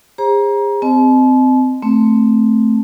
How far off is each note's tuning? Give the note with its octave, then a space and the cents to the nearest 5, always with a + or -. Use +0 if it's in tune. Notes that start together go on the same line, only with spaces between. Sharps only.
G#4 -40 C5 +25 A#5 +25
C4 -20 D#5 -20 A5 -40
A3 +0 C4 +0